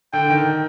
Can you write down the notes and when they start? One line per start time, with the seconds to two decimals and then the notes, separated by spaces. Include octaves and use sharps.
0.13 D3 G5
0.30 D#3